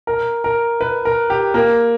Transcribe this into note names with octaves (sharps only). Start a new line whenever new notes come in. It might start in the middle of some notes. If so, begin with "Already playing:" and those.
A#4
A#4
B4
A#4
G4
A#3